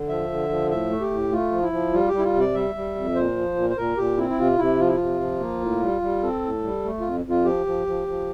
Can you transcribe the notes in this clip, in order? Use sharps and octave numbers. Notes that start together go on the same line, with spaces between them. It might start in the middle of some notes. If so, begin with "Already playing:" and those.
Already playing: D3
F3 E5
D3
F3
A2 E5
A3
G4
A2
A3 F4
F3
E4
F3
G3 F4
G3 G4
E4
F4
C3
D5
G3 E5
G3
F2
A#2 C5
F3
A#2
C5
A#2 A#4
A#2 G4
C4 E4
E4
C3 F4
C3 E4
F3 F4
E4
F4
C3
F3
A#3
A2
G3
G3
C4 A4
A2
G3
A3
F2 F4
F2 F4
F3 G4
F3
F3
F3